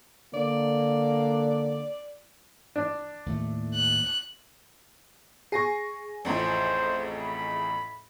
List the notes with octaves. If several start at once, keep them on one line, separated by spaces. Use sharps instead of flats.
D3 A#3 D5
D4
D#2 A2 A3
F#6
G#4 G#5 C#6 A#6 C7
A1 F2 A2 C5
B5